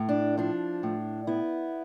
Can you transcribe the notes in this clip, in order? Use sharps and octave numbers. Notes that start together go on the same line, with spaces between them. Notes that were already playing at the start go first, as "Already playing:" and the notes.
Already playing: A2
D4
F3 D4
A2
B3 E4